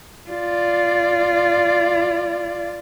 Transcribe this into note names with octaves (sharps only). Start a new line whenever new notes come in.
F4 D5